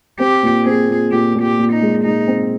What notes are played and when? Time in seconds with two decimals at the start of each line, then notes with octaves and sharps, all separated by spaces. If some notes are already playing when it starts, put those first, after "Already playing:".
0.19 C4 G4
0.43 A#2
0.65 C4 G#4
0.89 A#2
1.12 A#2 G4
1.35 A#2
1.42 G4
1.58 A#2
1.73 D#4
1.81 G#3
2.04 G#3 D#4
2.28 C4